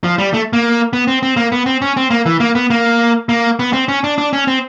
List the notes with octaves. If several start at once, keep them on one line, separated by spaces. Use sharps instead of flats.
F3
G3
A3
A#3
B3
C4
C4
A#3
B3
C4
C#4
C4
A#3
E3
A#3
B3
A#3
A#3
B3
C4
C#4
D4
D4
C#4
C4